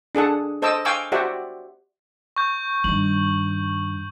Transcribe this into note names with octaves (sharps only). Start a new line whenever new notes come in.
D4 G#4 A4 F#5
A4 C5 D#5 A5 D6 E6
F5 G5 G#5 C#6 D6 E6
F#4 G4 C5 D5 E5 F#5
C#6 G6
G2 D#3 F#7